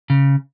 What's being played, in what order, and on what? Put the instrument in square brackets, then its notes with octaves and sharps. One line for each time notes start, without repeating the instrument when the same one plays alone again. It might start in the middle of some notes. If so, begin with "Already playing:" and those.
[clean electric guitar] C#3